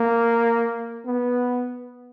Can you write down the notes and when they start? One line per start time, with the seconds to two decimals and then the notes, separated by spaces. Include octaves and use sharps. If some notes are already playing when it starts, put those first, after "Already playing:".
Already playing: A#3
1.05 B3